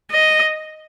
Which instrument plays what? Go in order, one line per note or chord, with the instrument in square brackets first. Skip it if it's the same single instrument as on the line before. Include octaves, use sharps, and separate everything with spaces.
[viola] D#5